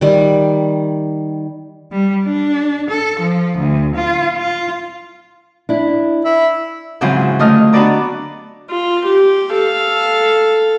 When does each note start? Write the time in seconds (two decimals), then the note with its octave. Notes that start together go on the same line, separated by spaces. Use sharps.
0.01 D#3 G3
1.92 G3
2.25 D4
2.90 A4
3.20 F3
3.58 D2
3.96 F4
4.37 F4
5.69 D4 E4
6.25 E4
7.01 G#2 C#3 E3 F#3 C4 F4
7.39 D3 A3 F4 D#5 D#6 F6
7.73 B3 D4 F#4 B4 D5 A#5
8.71 F4
9.06 G4
9.54 A4 F5